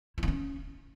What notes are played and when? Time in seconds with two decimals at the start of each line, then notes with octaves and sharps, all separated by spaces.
0.18 E4
0.23 D#4
0.28 C#4